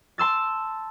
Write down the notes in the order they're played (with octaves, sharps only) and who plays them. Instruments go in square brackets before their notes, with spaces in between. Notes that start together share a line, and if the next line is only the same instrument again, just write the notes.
[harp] A5 C6 E6 A6